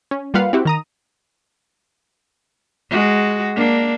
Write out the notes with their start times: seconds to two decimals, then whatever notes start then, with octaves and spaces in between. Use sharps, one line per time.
0.11 C#4
0.34 G3 A#3 F4 B4 F5 F#5
0.53 C4 E4 F#4 G4
0.65 D#3 A#5 D#6
2.90 G#3 F#4
3.56 A#3 D4